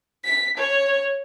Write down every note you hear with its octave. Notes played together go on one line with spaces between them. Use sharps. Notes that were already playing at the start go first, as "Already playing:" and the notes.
B6
C#5